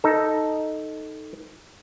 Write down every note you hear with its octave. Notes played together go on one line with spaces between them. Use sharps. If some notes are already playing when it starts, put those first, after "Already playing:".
D#4 A4